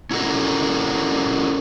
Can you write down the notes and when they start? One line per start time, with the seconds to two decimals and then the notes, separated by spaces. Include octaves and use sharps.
0.11 C#4 E4 F#4 A4 A#4